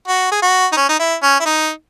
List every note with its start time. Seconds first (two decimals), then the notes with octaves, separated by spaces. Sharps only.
0.08 F#4
0.31 G#4
0.42 F#4
0.72 D#4
0.77 C#4
0.89 D#4
0.99 E4
1.23 C#4
1.40 E4
1.46 D#4